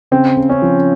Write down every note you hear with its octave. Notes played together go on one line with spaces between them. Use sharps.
C#3 C4
C#3
C#4
F3